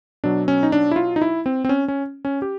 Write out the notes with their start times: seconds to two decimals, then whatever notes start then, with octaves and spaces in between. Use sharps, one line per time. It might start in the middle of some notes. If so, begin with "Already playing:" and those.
0.24 B2 F#3 D4
0.48 C#4
0.63 D#4
0.72 D4
0.91 E4
0.96 F4
1.16 D#4
1.22 E4
1.46 C4
1.65 C4
1.69 C#4
1.88 C#4
2.25 C#4
2.42 G4